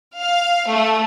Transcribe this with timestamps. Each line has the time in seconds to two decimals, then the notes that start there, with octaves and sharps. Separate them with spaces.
0.20 F5
0.70 A3